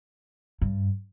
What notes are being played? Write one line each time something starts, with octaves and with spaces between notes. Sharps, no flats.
G2